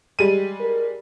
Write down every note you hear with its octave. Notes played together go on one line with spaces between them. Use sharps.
G3 G#3 D#7
A#4